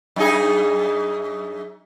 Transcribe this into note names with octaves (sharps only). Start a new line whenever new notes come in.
F#2 D#4 G#4